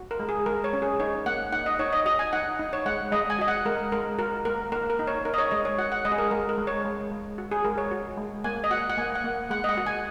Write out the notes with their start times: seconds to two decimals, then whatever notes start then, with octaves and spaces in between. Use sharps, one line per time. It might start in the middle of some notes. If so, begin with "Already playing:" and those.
Already playing: F#4
0.11 A#4
0.20 G#3
0.29 G#4
0.46 G#3 A#4
0.64 C#5
0.73 C#4
0.82 G#4
1.00 D#4 C#5
1.26 A#3 F#5
1.53 D#4 F#5
1.66 D#5
1.79 D#4 C#5
1.93 D#5
2.06 F#4 D#5
2.19 G#5
2.33 D#4 F#5
2.59 D#4
2.73 C#5
2.86 G#3 F#5
3.12 G#3 D#5
3.30 G#5
3.39 F#4 D#5
3.48 F#5
3.65 G#3 A#4
3.92 G#3 A#4
4.19 F#4 A#4
4.45 A#3 A#4
4.72 A#3 A#4
4.90 A#4
4.99 D#4
5.07 C#5
5.25 D#4 A#4
5.34 D#5
5.38 C#5
5.51 G#3 D#5
5.65 C#5
5.78 F#4 F#5
5.92 F#5
6.05 G#3 D#5
6.12 G#4
6.18 A#4
6.31 G#3 A#4
6.49 A#4
6.58 G#3
6.67 C#5
6.85 G#3
7.11 G#3
7.38 F#4
7.51 G#4
7.64 G#3 A#4
7.78 C#5
7.91 F#4
8.17 G#3
8.44 A#3 G#5
8.64 D#5
8.71 F#4 F#5
8.90 F#5
8.97 A#3 G#5
9.15 F#5
9.24 A#3
9.50 G#3 F#5
9.64 D#5
9.69 F#5
9.77 F#4
9.86 G#5